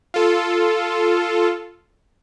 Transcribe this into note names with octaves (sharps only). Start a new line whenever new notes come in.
F4 A4